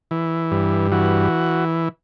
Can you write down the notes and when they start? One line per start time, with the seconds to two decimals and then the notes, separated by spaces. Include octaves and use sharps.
0.11 E3
0.51 G2
0.92 E3 F#4